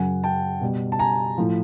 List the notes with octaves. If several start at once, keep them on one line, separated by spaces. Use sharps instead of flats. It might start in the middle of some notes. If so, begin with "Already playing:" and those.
Already playing: F#2 C#3 F#3 F#5 G#5
G5 A5
B2 G3
A5
G#5 A#5
A2 F3